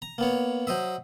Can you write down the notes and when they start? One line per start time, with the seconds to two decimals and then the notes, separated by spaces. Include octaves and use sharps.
0.02 A#5
0.18 A#3 B3 C#5
0.67 F#3 C5 D#5 E5